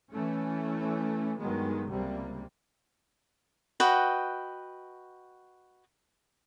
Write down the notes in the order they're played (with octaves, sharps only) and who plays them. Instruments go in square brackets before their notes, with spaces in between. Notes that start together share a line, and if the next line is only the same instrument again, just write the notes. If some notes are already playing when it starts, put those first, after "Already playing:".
[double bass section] E3 A3 C#4
G2 D#3 F#3 G#3 B3
C#2 C3 G3 A#3
[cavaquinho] F#4 B4 D#5 G5